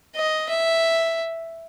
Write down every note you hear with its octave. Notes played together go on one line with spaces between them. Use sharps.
D#5
E5